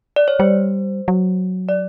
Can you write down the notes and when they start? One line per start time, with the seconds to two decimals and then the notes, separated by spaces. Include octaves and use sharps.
0.16 D5
0.28 C#5
0.40 G3 C5
1.08 F#3
1.69 D5